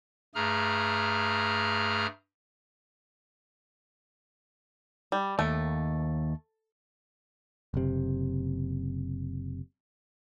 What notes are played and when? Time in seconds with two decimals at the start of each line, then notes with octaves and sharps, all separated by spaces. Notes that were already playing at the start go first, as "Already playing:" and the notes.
0.35 G2 A3 G#4 A#5 F6
5.12 G3
5.39 D#2 A3
7.74 F#1 C3